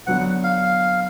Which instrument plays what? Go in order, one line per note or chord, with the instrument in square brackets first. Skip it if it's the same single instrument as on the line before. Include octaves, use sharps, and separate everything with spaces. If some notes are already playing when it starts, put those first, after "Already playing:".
[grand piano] D3 F#3 B3 [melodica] F#5
[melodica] F5